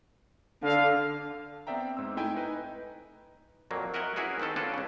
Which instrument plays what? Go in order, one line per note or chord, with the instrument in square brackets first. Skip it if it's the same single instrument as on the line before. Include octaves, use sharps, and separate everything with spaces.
[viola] D3 [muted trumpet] F5
[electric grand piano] B3 C4 D5 E5 G5 A#5
G#2 C4 E6
A3 D#4 E4 G5 G#5
D#4 B4
[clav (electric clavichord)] F2 A#2 F#3 A#3
F#4 A#4 D#5 E5 F#5 G#5
C#4 E4 F#4 G#4 A#4 B4
D#3 C4 F#4 A4 D#5
C#4 D4 F4 A4 B4 D5
C#2 C#3